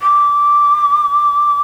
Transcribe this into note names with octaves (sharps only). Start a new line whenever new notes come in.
D6